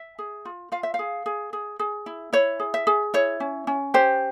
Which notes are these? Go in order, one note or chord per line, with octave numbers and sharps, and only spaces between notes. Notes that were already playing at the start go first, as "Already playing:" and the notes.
Already playing: E5
G#4
F4
F4 F5
E5
F5
G#4
G#4
G#4
G#4
E4
E4 C#5
G#4
E5
G#4
E4 C#5
C#4
C#4
G4 C5